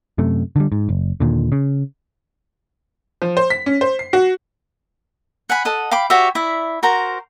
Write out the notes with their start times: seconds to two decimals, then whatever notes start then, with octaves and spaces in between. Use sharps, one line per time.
0.18 F#2 C3 A3
0.56 D3 F3 G3
0.72 G#2
0.89 F#1
1.20 D#2 A#2 D3
1.52 C#3
3.22 F3
3.37 C5
3.50 B6
3.66 C#4
3.81 C5
3.99 C7
4.13 F#4
5.50 F#5 G#5 B5
5.65 A4 D#5 F#5
5.91 F5 G5 B5 D6
6.10 F#4 G4 C#5 E5
6.35 E4 D5 E5
6.83 F#4 A#4 C5 A#5